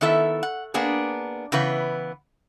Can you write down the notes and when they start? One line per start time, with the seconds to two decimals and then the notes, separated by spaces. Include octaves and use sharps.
0.01 D#3 B3 E4 A4 E5
0.43 F#5
0.74 A#3 B3 D4 G#4
1.52 C#3 E3 B3 B4